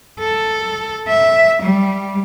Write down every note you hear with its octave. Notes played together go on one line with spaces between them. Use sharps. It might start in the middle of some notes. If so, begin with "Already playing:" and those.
A4
E5
G3